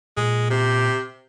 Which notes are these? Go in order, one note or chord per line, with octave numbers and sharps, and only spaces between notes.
A#2 G#3
C3 G4